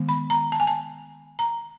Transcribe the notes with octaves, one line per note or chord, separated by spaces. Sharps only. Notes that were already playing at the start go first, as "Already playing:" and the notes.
Already playing: D#3 G#3 B3
B5
A#5
A5
G#5
A5
A#5